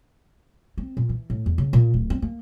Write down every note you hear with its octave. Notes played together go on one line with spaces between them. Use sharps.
C4
A#2
E3
A2
E2
C#3
A#2
D1
C4
A#3